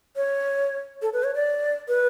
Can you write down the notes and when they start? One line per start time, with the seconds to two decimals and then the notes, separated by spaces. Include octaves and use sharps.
0.16 C#5
1.02 A4
1.13 B4
1.24 C#5
1.35 D5
1.88 B4